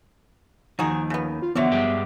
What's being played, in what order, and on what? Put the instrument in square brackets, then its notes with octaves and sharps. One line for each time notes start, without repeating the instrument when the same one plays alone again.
[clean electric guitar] D#2 D#3 [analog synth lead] F3 [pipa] D#4 F#4 G#4
[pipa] C#3 B3
[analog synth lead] F4
[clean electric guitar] E2 D3 [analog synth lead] F3 [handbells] B3 E5 [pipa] F#4 C#5 D5
[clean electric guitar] G2 G#3 G4